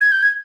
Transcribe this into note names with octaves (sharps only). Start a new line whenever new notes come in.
G#6
G6
G#6